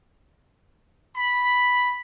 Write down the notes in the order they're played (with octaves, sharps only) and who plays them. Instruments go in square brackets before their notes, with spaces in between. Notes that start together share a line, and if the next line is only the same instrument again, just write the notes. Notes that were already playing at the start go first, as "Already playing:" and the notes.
[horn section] B5